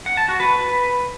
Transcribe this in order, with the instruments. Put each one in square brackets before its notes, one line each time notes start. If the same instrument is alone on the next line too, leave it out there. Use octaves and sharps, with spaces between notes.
[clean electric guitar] F#5
A5
F#4
B4